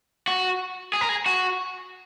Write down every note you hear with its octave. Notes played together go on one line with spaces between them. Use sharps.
F#4
G#4
A#4
G#4
F#4